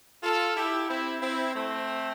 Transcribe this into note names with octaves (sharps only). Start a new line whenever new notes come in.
F4 A4
E4 G4
C4 E4
C4 E4
A3 C4